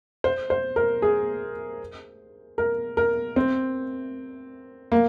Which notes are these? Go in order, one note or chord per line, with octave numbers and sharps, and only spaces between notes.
C5
C5
A#4
G#4
A#4
A#4
C4
A#3